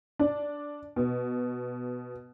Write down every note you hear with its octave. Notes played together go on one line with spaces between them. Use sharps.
D4
B2